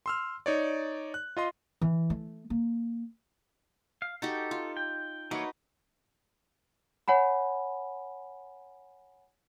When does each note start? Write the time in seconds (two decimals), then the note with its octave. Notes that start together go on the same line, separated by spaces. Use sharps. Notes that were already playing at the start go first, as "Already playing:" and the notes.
0.06 C6 E6 F6
0.46 D#4 C#5 D5
1.14 F#6
1.37 F4 D#5 C6
1.82 E3
2.10 A3
2.50 A#3
4.02 F5
4.22 D#4 F#4 G4 A4
4.51 F4
4.77 G5
5.31 E3 A#3 D#4 F#4 B4 C#5
7.08 C#5 F#5 G#5 B5